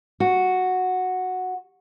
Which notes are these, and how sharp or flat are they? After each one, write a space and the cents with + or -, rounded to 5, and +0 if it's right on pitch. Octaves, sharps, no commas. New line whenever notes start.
F#4 -5